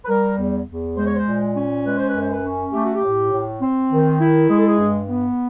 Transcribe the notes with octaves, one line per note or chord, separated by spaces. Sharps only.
B4
G3 A#4
E2
E2
G#3 C5
C#5
C5
A#2
C#4
G#3 B4
C5
F#2 B4
C5
B4
C#4
A3 G4
F#4
G4
A2
A2
C4
D#3
E4
G#3 G#4
A4
G#4
G2
B3